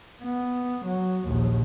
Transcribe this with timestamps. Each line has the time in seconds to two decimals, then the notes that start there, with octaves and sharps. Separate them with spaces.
0.23 B3
0.86 F#3
1.28 A#1 D#2